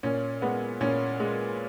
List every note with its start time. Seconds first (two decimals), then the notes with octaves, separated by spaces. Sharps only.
0.03 A#2 C#4
0.42 G#3 B3
0.81 A#2 C#4
1.20 G#3